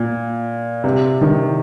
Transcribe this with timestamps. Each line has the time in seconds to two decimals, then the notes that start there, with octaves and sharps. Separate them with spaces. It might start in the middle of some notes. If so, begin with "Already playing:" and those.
Already playing: A#2
0.84 C3
1.21 D#3